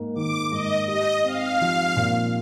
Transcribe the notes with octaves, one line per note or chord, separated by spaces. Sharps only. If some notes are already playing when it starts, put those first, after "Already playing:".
Already playing: G#2 A#3
D#3 D6
G#2 D#5
G4 D#5
C4 F5
F3
A#2